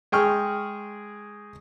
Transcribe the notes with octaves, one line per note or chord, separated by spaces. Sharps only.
G#3 G#4 G5 C#6 F6